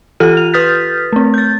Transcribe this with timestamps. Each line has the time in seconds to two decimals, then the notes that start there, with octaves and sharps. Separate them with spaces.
0.20 E3 F4 G4 A4 F6 D#7
0.37 F7
0.54 B4 D#6 F6 G6 A6 B6
1.13 A3 C4
1.34 G6 A6